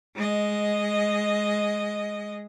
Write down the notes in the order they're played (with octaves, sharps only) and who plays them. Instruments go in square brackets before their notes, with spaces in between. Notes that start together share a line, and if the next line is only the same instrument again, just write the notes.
[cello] G#3 D#5